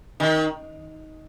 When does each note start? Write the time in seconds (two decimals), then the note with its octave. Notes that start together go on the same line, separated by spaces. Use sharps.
0.20 D#3